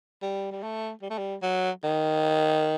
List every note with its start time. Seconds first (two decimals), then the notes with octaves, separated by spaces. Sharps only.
0.23 G3
0.52 G3
0.63 A3
1.02 G3
1.11 A3
1.18 G3
1.43 F#3
1.84 D#3